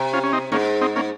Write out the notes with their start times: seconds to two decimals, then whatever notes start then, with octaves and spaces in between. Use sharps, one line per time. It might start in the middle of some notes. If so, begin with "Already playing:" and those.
Already playing: C3
0.13 C#4 F4
0.23 C#4
0.33 C4 D#4
0.52 G#2 A#3 C#4
0.81 C4 D#4
0.96 A#3 C#4